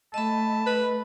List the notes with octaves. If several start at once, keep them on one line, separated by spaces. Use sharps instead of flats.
A3 D#5 A5 B5
B4